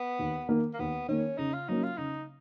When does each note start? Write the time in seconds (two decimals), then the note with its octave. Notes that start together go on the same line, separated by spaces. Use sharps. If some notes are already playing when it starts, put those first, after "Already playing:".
Already playing: B3
0.19 D#2
0.49 D#3 A#3
0.73 A#3
0.79 D#2 B3
1.08 D#3 A#3 C#4
1.38 C#3 D#4
1.53 F4
1.68 F#3 A#3 C#4 D#4
1.83 F4
1.97 C#3 D#4